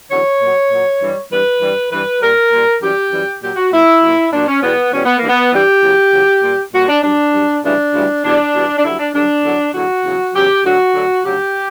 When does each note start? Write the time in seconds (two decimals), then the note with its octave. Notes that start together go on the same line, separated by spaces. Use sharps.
0.10 E2 D3 F#3 C#5
0.40 A#2 F#3
0.71 A#2 F#3
1.01 G2 E3 G3
1.31 G2 E3 G3 B4
1.61 G2 E3 G3
1.92 G2 E3 G3 B4
2.21 A#2 G3 A#4
2.51 A#2 G3
2.81 F#2 E3 G3 G4
3.12 F#2 E3 G3
3.41 A#2 F#3 G4
3.56 F#4
3.72 A#2 F#3 E4
4.02 A#2 F#3
4.32 A#2 F#3 D4
4.47 C#4
4.62 E2 B2 G3 B3
4.92 E2 B2 G3 C#4
5.05 B3
5.17 A#3
5.23 G2 E3 G3
5.29 B3
5.52 G2 E3 G3 G4
5.83 E2 C#3 F#3
6.13 E2 C#3 F#3
6.43 A#2 G3
6.73 A#2 G3 F#4
6.88 D4
7.04 G2 F#3 D4
7.33 G2 F#3
7.63 D2 C#3 E3 G3 D4
7.94 D2 C#3 E3 G3
8.24 E2 B2 G3 D4
8.54 E2 B2 G3
8.77 D4
8.84 G2 D3 F#3 E4
8.99 D4
9.14 G2 D3 F#3 D4
9.44 E2 D3 F#3
9.74 E2 D3 F#3 F#4
10.05 E2 C#3 F#3
10.34 E2 C#3 F#3 G4
10.65 D2 D3 F#3 F#4
10.95 D2 D3 F#3
11.25 D2 C#3 F#3 G4